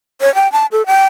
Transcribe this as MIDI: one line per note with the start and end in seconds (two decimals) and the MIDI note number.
0.21 0.34 73
0.35 0.51 79
0.52 0.66 81
0.72 0.86 69
0.86 1.07 79